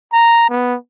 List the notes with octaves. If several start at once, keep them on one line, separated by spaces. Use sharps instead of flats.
A#5
B3